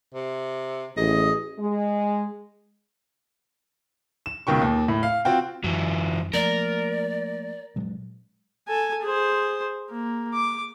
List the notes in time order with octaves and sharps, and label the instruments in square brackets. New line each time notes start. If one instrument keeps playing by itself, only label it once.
[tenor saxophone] C3
[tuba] A1 [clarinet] G#4 [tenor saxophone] D#5
[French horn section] G#3
[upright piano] E7
C#2 B2 D#3 G5 C#6
D#2
A2
F5
C4 F4 F#4 G5
[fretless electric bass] F#2 [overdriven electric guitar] E3 F#3
[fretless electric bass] F3 A3 A#3 [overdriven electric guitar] A#4 [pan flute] D5
[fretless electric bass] A#2 F#3 G#3
[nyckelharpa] A4 G#5
G#4 C5
A#3
D6